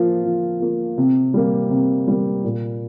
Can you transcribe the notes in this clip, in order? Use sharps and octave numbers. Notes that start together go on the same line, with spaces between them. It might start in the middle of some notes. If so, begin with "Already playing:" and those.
Already playing: F3 A#3 F4
F3
A#3 F4
C3
G3 A#3
C3
G3 A#3
A#2